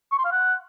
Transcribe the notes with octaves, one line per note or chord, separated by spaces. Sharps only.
C#6
C6
F5
F#5